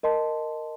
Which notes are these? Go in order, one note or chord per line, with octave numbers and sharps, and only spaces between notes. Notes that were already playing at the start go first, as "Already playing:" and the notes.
A#4 D#5 A5 C6